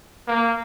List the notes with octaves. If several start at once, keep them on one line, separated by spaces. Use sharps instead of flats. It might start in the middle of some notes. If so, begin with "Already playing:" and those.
A#3